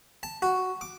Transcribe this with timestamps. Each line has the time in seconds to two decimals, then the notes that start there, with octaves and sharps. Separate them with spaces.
0.23 A5
0.42 F#4
0.81 D6